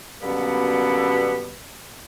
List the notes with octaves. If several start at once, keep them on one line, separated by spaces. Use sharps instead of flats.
F#2 B2 D3 G3 A#3 B3